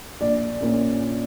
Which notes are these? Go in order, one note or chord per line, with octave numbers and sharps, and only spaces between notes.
A#1 D5
A#2 A#3 C#4